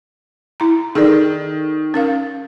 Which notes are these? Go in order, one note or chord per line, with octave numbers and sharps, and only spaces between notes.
E4 A#5
D#3 G#4 A4 D5
C#4 A#4 F5